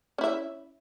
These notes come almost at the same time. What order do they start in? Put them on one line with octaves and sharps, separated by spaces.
C#4 E4 E5